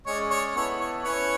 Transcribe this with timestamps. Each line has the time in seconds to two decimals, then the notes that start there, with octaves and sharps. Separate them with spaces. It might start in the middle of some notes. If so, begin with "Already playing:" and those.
0.06 G#3 C#4 G#4 C#5 D5
0.30 C#5
0.55 B3 E4 A4 C#5
0.79 C#5
1.04 C#4 E4 B4 C#5